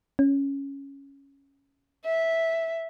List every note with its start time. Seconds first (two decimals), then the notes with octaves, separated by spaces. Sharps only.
0.19 C#4
2.05 E5